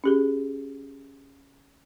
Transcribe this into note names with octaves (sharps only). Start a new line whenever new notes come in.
C#4 G4 G#4